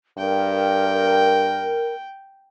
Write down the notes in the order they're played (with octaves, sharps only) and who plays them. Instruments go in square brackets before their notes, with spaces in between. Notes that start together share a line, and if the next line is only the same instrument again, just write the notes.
[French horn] G2 [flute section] A#4 [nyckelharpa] G5